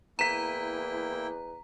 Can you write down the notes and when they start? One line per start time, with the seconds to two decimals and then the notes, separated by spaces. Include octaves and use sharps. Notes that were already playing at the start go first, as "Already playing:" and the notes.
0.19 E2 A#3 E4 G5 A#5 B6 E7